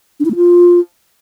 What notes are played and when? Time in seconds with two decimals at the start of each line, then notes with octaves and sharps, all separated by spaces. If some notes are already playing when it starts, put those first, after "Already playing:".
0.20 D4
0.25 E4
0.30 A3
0.36 F4